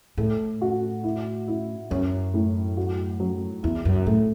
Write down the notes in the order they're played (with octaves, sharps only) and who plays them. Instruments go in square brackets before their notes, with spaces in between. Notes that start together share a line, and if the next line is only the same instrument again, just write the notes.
[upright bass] A2 [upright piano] A4
[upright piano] F#4
E4
E4
[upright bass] F#2 [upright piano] C#4
[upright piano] A2
F#4
F#3
[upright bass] E2 [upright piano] E4
[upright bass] F#2
[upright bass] A2 [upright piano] A3